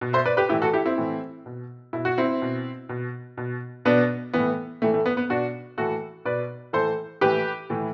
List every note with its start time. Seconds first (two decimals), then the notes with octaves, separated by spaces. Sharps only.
0.01 B2
0.13 C5 E5
0.25 B4 D5
0.37 G4 B4
0.49 A2 E3 E4 G4
0.62 F#4 A4
0.73 E4 G4
0.86 C4 E4
0.98 A2 E3
1.46 B2
1.93 B2 E4
2.05 F#4
2.18 C4 E4
2.42 B2
2.89 B2
3.37 B2
3.85 B2 B3 D4
4.34 A2 E3 B3
4.82 A2 E3 A3
4.94 A3
5.06 B3
5.17 B3
5.29 B2 D4 F#4
5.78 A2 E3 F#4 A4
6.25 B2 B4 D5
6.73 A2 E3 A4 C5
7.21 A2 E3 G4 B4
7.70 A2 E3